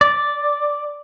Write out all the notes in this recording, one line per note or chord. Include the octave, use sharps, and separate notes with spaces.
D5